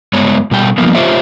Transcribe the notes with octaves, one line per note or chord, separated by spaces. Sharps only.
G2 G#3 B3 C#5
B2 G3 G5
F3 G3 A#3 B3
F4 G4 C5 C#5 E5